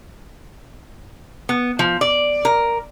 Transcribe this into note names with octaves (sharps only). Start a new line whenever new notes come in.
B3
F3
D5
A#4